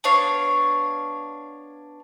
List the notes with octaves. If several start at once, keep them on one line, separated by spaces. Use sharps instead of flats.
B3 D4 C#5 F5